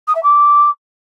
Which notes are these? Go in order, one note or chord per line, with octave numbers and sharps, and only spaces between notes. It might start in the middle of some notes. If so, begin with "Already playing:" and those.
D#6
E5
D6